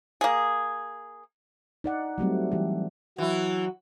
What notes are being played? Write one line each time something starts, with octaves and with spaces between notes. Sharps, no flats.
A#3 G#4
D#4 D5 F#5
F#3 G3 A3 C4
E3 G3 G4
E3 F#3 E4 F#4